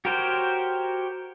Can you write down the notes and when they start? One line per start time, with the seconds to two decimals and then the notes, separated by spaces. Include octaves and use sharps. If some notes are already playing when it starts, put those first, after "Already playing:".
0.05 F#4 G4 A#4 C5 C#5